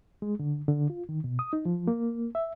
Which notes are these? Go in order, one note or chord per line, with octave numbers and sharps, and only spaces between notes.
G#3
D3
D3
F4
D#3
B2
D#6
D#4
F3
A#3
E5